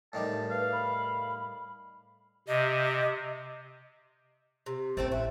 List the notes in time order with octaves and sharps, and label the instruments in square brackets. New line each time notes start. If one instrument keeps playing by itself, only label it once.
[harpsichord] A2 D#3 G3 [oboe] A5
[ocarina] B4 [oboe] F5
[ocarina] B5
[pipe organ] C3 [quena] D#5
[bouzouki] C3
[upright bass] A1 [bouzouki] A3 C4 A4 [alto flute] C5
[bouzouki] F#4 [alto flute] E5